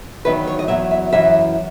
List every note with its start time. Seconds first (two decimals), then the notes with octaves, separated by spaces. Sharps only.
0.25 E2 D#3 F#3 B4
0.47 C#5
0.59 D#5
0.68 E2 D#3 F#3 E5
0.91 E5
1.13 F#2 E3 E5